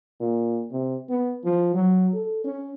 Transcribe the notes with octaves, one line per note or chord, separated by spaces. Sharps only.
A#2
C3
B3
F3
F#3
A4
C#4